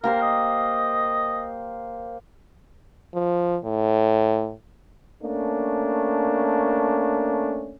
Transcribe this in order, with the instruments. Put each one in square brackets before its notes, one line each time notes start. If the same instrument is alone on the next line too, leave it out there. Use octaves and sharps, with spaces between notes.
[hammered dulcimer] A#3 G4 C5 [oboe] A#4
[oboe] D#5
[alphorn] F3
A2
[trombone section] A3 A#3 C#4 D4